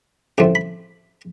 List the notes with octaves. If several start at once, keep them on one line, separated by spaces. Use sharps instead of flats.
A1 A2 F3 A3 C4 D6
B5